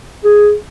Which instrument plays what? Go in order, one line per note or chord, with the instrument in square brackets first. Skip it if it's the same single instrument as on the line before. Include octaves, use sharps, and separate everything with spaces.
[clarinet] G#4